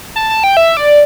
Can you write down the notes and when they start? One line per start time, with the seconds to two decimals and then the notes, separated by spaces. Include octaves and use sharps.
0.16 A5
0.30 A5
0.44 G5
0.57 E5
0.77 D5